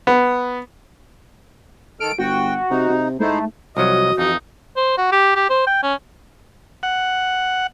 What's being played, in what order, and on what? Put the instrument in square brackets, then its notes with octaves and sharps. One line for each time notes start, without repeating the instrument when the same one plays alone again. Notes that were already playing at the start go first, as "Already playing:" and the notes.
[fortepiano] B3
[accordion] D#3 A4 F6 [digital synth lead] D7
[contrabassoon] G1 [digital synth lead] F#4 [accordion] G5
[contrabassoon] C3 [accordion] D#4
[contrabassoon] C3
[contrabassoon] G#2 [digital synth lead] A3 [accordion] D#4 E4 C5
[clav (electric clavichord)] C2 F3 F#3 [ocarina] F#4 [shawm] D#5
[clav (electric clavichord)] F2 E3 [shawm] D#4
[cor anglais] C5
F#4
G4
G4
C5
G5
C#4
[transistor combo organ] F#5